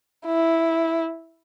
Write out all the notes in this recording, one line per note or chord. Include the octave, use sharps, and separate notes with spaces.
E4